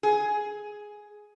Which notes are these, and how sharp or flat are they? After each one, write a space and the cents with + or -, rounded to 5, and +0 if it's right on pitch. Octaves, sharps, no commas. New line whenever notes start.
G#4 +5